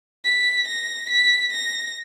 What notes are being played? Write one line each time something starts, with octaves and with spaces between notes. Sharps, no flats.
B6
A#6
B6
A#6